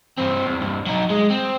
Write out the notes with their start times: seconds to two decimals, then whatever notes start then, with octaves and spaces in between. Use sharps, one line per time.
0.18 G2 C4
0.46 E2
0.61 C2 G2
0.86 F#3 D#4
1.10 G#3
1.30 C4